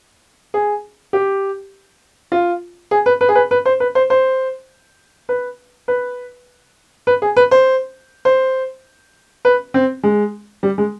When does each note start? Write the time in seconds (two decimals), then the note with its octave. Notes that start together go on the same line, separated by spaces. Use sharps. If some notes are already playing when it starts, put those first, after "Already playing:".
0.54 G#4
1.13 G4
2.32 F4
2.91 G#4
3.06 B4
3.21 B4
3.29 G#4
3.35 B4
3.51 B4
3.65 C5
3.80 B4
3.95 C5
4.10 C5
5.29 B4
5.88 B4
7.07 B4
7.22 G#4
7.37 B4
7.51 C5
8.25 C5
9.45 B4
9.74 C4
10.04 G#3
10.63 G3
10.78 G#3